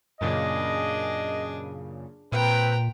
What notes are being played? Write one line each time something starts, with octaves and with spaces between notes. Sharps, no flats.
F#2 A#2 C#3 D4 G#4 D#5
A#2 C4 B4 G5 A#5